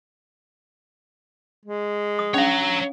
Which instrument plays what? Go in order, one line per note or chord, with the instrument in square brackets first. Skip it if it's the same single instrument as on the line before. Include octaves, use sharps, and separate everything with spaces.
[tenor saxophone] G#3
[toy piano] D#6
[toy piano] C#4 D4 F5 [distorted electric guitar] C#5 A#5